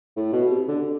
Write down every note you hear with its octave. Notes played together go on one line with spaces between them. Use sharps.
A2
B2
C3
D3